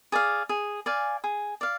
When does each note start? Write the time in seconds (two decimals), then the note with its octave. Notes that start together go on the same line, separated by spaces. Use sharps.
0.12 G#4 D5 F5
0.49 G#4
0.86 D5 F5 G#5
1.24 G#4
1.61 D5 F5